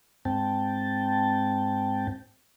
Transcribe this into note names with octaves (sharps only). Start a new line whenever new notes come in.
G#2 C4 G5 A5